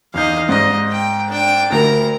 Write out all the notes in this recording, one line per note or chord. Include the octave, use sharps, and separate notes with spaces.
E2 D#4 D#5 F5 G6
G#2 D5 D#5 A#6
G5
D4 G5
D2 A#4 A#5